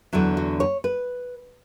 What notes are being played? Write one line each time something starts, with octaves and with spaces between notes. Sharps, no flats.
E2 D3 F#3 E4
F#4
C#5
B4